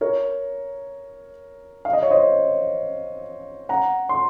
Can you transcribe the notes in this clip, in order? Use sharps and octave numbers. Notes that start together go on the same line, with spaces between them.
A#4 C#5
F5
D#5
C#5
C5 D#5
F#5 A#5
C6